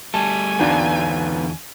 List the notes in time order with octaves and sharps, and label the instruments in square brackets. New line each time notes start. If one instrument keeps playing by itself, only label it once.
[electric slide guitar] G3 A3 [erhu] G#5 [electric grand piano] A5
[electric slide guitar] E2 D3 [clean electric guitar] B3 D#4 F5 [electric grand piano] D4 F#4